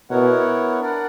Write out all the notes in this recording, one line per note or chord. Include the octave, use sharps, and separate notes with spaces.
B2 B3 E4 A#4 C#5 F#5
D4 A#4 D5 F#5